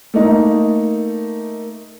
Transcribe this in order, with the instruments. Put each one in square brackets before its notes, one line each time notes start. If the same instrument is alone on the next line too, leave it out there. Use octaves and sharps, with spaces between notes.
[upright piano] A3 A#3 D#4